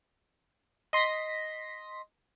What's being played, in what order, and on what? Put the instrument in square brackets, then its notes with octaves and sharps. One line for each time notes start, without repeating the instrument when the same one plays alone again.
[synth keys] D#5 C6 A#6 B6